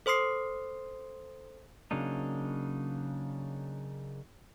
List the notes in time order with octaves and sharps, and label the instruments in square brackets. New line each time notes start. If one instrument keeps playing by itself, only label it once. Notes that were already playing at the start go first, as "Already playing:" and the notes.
[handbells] A4 C5 C6 D#6 C7
[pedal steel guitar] C#3 F#3 A#3 D4 D#4